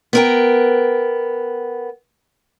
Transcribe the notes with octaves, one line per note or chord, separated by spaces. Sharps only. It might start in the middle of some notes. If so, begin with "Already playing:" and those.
B3 A#4 G5